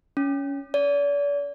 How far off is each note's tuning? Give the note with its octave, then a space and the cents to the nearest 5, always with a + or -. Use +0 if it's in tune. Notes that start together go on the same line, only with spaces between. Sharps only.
C#4 +15
D5 -40